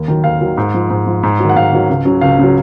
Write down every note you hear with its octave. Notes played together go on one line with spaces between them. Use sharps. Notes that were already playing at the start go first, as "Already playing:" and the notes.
Already playing: D#2
D#3 F#3
D#2 F5
D#3 F#3
G#2
F3
G#2
F3
G#2
D#3 F#3
F#5
G#2 F5
D#3 F#3
C#2
C#3 F#3
C#2 F5
C#3 F#3